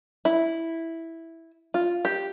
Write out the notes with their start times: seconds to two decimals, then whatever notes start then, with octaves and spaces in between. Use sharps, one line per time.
0.25 E4
1.74 F4
2.05 G4